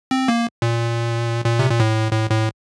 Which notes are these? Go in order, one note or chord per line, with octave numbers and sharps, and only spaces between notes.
C4
A#3
A#2
A#2
C3
A#2
A2
A2
A2